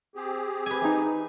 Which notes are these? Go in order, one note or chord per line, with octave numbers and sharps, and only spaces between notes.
C4 G4 G#4
B4 G#5
E3 D#4